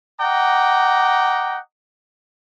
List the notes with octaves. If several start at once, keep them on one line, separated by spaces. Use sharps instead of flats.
D#5 F#5 G5 A#5 D6